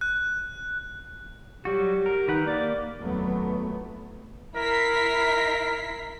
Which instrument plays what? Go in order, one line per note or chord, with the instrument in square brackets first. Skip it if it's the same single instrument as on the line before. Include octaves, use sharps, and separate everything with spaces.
[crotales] F#6
[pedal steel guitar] F#3 G3 F#4 [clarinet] G4
[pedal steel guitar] A#4
[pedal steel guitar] D#3 B4 F#5 [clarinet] D#4
[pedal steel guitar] A#3 [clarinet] D5
[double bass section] F1 D#2 F#3 A3 B3
[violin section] E4 B6 C7 [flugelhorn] A#4